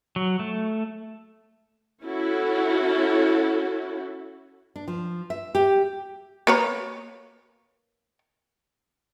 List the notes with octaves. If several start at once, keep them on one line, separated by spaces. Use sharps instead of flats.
F#3
A3
C#4 E4 F#4 A4
D4
F3
E5
G4
A#3 B4 C#5